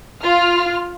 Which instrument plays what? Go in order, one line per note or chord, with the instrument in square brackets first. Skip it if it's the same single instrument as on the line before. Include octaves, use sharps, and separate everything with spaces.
[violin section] F4 F6